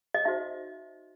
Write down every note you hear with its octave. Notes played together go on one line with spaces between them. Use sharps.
D#5
D#4 F#4 C5 E5